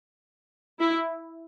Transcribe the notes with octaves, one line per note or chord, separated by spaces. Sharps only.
E4